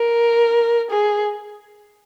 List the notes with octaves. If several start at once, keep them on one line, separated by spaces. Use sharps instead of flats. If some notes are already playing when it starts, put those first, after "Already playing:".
Already playing: A#4
G#4